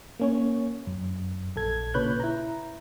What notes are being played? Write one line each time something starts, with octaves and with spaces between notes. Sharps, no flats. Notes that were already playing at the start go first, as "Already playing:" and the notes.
A#3 C#4 C#5
F#2
A#1 A4 G#6
A#2 C#3 B4 C#5 F#6 G6
E4 A#5